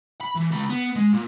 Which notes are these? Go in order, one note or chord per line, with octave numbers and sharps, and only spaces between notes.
B5
E3
C#2 B5
B3
G#3
A#2